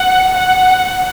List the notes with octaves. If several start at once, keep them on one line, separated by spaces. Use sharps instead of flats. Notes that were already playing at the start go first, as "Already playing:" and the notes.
Already playing: F#5
F#5